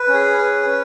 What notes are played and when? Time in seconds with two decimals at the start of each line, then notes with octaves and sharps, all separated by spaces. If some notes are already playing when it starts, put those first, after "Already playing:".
Already playing: B4
0.08 C#4
0.14 G#4
0.38 B4
0.67 C#4